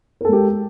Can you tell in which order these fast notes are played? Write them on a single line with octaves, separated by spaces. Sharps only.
A#4 A4 G#3 G4